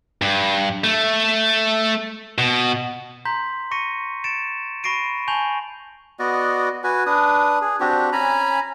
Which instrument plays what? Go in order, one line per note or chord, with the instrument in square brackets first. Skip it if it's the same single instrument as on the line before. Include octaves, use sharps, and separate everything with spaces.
[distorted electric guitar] G2
A3
B2
[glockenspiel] A#5 C6 G6 B6
C#6 A#6 C#7 D#7
A6 C#7 D7 E7
B5 C#6 A#6 C7 D7 D#7
G#5 A5 C#6 G6 F7 F#7
[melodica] B3 F#4 D5 D#5
F#4 B4 G#5
D4 B4 D#6
G#4
C4 D4 F#4 G4
C#4 G#5 A#5 B5